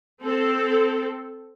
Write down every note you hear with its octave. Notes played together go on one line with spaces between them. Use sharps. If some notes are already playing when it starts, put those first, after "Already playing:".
C4 A4